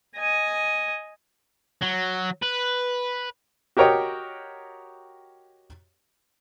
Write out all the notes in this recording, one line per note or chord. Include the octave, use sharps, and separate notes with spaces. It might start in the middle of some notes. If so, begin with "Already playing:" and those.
D#5 G#5
F#3
B4
F#4 G4 A#4 C#5 D#5 G5